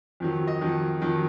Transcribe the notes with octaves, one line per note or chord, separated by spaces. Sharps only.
F2 D#3 F#3
D#5
F2 D#3 F#3
F2 D#3 F#3